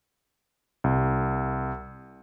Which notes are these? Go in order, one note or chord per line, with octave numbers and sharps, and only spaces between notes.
C2